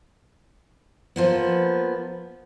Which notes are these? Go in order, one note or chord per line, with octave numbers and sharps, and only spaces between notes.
F3 A#3 B3